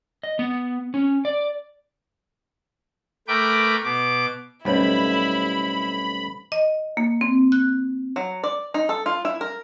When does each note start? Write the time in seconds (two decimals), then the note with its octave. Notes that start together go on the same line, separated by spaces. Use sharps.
0.23 D#5
0.39 B3
0.94 C#4
1.25 D5
3.28 A3 A#4 B4 G5 D6
3.84 B2 D6
4.65 B1 F2 G3 A3 C#4 E4 B5
6.52 D#5
6.97 A#3
7.21 C4
7.52 F#6
8.16 F#3
8.44 D5
8.74 D#4
8.89 A4
9.06 F4
9.25 E4
9.41 A#4